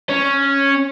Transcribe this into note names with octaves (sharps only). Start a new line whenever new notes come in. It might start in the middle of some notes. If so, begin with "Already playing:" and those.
C#4